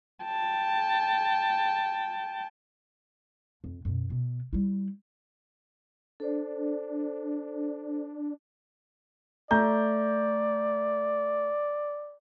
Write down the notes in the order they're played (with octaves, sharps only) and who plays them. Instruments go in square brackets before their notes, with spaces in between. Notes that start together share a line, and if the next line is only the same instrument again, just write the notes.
[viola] G5 A5
[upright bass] F2
F#2 B2
B2 B3
G3 E4
[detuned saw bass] D4 [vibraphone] A4 C5 D5
[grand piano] A3 A#5 G6 [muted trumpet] D5